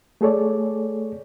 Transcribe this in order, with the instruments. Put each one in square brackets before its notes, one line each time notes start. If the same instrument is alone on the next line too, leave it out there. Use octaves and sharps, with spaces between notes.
[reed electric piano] A3 G#4 A4 C#5 D5